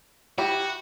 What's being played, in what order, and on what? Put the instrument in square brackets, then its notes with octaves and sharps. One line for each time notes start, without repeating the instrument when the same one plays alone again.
[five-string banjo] E4 G4 [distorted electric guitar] F#4